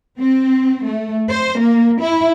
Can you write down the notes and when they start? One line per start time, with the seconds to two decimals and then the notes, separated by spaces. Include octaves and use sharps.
0.18 C4
0.84 A3
1.28 C5
1.59 A#3
2.00 E4